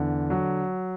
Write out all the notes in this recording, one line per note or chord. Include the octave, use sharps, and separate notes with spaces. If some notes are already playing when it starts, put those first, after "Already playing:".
Already playing: E2 D3
F#3